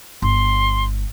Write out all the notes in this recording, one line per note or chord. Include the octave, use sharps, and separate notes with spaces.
G1 C6